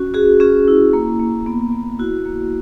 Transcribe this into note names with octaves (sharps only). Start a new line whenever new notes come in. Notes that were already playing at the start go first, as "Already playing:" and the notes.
Already playing: C#4 F#4
F#4 G#4
C#4 G#4
E4
A#3
A#3
B3
B3
E4 F#4
A#3